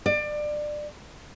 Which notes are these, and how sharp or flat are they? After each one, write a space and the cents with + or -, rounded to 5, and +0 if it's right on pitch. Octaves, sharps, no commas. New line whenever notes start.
D5 +25